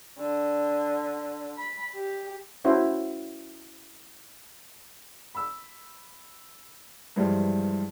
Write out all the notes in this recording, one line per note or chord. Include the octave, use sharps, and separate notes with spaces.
D3
B5
G4
C#4 E4 F#4 C5
B5 E6
G2 E3 F3 G3 G#3